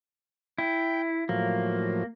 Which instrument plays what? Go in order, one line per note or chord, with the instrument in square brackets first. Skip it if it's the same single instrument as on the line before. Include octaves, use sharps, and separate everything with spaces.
[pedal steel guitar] E4 [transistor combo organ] G5
[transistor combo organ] A2 F3 F#3 [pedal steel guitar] A#3